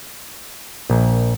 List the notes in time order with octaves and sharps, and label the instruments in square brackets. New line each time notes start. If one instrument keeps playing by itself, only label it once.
[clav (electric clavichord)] A#1